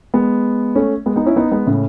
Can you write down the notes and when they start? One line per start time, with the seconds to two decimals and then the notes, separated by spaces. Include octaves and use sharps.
0.14 G#3 B3
0.75 A3 C#4
1.06 G#3 B3
1.16 B3 D#4
1.26 C#4 E4
1.36 B3 D#4
1.52 G#3 B3
1.67 A2 C#3